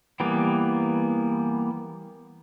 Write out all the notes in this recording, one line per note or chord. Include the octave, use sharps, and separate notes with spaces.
E3 G3 A#3 B3